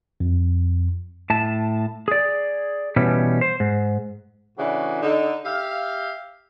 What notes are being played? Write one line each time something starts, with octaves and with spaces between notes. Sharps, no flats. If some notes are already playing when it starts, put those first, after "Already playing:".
F2
A2 A5
G#4 D5
B2 E3 G3 C#4
C5
G#2
A2 C#3 E3 D4 F#4
D3 D#4
G4 E5 F5